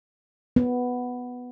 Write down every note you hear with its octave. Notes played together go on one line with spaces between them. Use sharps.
B3